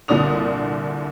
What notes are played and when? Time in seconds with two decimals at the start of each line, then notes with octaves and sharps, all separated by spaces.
0.08 C2 A#2 D3 D5 D#6 F7